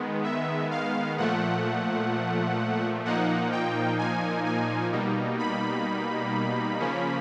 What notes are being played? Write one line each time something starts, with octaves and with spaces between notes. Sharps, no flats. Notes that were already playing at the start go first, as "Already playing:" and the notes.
Already playing: D#3 G#3 B3
E5
F5
A#2 F3 A3 F#5
A#2 F3 A#3 D#4 F#5
G5
G#5
G#5
B2 G3 A#3 D#4
B5
C#3 F3 A#3 C#4